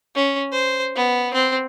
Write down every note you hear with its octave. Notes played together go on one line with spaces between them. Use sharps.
C#4
C5
B3
C4